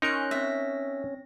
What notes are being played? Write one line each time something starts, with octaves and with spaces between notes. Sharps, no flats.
C#4 D#4 A#4 C6 F#6
C4 E5 A#6